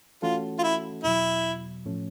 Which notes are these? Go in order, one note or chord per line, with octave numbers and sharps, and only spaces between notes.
E3 A3 C#4 F4 F#4 A4
F4
E4
E2 B2 F#3 E4
A2 F3 A3 C#4